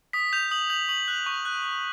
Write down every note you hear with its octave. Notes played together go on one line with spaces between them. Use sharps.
D#6 B6
G6 F7
D#6 F#7
G6 F#7
C#6 F#7
F#6
C#6
F#6